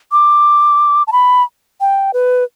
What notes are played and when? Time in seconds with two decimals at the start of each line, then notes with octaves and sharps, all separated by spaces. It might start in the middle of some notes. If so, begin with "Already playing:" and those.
0.12 D6
1.07 A5
1.12 B5
1.81 G5
2.14 B4